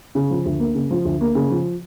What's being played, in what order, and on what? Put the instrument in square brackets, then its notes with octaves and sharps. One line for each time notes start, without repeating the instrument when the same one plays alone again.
[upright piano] C#3
F3
D2
A#3
C#3
F3
D2
A#3
C#3
F3